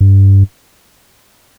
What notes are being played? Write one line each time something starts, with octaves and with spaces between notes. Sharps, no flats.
G2